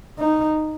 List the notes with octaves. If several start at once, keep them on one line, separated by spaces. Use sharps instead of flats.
D#4